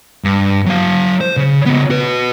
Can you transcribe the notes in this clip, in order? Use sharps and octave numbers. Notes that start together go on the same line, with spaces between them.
G2
F#3 F5
C5
C#3
C#3 B3
F#4 B4